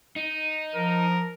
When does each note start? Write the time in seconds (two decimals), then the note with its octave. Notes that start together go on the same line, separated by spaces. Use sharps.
0.16 D#4
0.75 F3 A#4